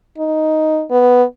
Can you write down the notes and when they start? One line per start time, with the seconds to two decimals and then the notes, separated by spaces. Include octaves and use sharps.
0.18 D#4
0.91 B3